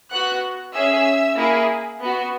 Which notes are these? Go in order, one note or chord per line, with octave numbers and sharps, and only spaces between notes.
B3 F#4 F#5 F#6
C#4 G#4 E5 E6
A#3 E4 G#4
B3 F#4